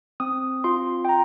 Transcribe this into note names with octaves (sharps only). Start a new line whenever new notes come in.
C4 D#6
F4 C6
G5
A#5